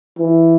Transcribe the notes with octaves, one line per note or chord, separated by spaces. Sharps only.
E3